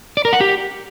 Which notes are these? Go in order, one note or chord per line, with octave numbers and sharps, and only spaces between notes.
D5
A#4
F#5
G4